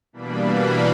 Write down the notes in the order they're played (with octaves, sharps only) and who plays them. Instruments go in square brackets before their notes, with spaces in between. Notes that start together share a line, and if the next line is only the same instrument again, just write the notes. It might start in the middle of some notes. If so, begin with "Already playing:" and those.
[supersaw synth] B2 E3 G3 A#3 D4 B5